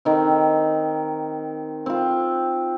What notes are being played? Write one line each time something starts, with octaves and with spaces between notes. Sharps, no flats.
D#3 C4
C4 F4